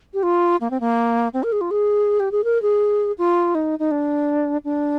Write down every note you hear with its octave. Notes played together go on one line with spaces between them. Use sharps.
G4
F4
A#3
C4
A#3
C4
A#4
G#4
F4
G#4
G4
G#4
A#4
G#4
F4
D#4
D#4
D4
D4